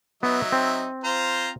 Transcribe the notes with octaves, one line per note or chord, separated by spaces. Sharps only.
F#3 B3 D#4 E5
C4
F4 C5 A#5